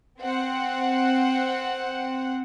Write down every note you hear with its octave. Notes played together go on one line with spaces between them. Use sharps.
C4 F#5